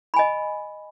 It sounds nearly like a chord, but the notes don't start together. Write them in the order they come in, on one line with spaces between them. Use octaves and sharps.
B5 G#5 D#5